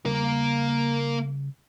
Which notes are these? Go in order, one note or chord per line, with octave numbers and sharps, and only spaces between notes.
C#3 G3 A#3 A#4